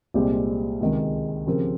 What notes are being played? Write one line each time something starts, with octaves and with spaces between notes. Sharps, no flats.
C2 A#2 G#3 C4 G4
C#2 C3 D#3 G#3
C#3 F3 C4 G4 A#4